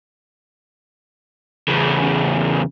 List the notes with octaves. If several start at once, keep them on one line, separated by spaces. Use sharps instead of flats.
E2 C#3